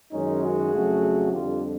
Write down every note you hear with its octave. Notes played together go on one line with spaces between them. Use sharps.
F#2 D#3 G#3 C#4 D#4
F#4 G#4
F2 C#3 F#3 A3
F2 D3 G3 F4 G4